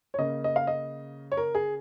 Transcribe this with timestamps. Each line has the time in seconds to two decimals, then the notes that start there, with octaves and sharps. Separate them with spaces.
0.14 C#5
0.18 C#3 A#3 D#5
0.44 D#5
0.56 F5
0.67 D#5
1.32 C#5
1.37 A#4
1.55 G#4